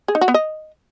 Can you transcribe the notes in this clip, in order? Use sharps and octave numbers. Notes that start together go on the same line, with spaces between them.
G#4
D#4
F#4
B3
D#5